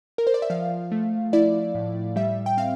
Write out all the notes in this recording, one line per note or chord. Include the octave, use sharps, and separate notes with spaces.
A#4
C5
D5
E5
F3 F5
A3
E4 D5
A2
G3 E5
G5
C4 F5